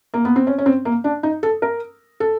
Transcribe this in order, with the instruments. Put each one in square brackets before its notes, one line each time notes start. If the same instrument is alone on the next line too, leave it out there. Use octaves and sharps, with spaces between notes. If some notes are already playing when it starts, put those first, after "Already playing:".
[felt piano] A#3
B3
C4
C#4
C#4
C4
A#3
D4
D#4
A4
A#4
A4